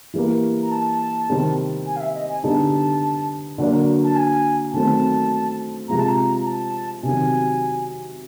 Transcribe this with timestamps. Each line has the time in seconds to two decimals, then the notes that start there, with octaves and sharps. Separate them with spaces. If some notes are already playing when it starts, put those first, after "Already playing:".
0.14 E3 G3 A#3
0.62 A#5
0.71 A5
1.29 C3 D#3 G3 C4
1.86 G#5
1.96 F5
2.00 E5
2.15 D#5
2.29 G#5
2.44 D3 G3 B3 D#4 A5
3.58 D3 F#3 A#3 D4
4.04 A5
4.16 G#5
4.73 D#3 F#3 A3 C4 A5
5.89 C3 F3 G#3 A#5
5.98 A5
6.08 A#5
6.37 A#5
6.46 A5
7.03 C3 D#3 F#3 G#5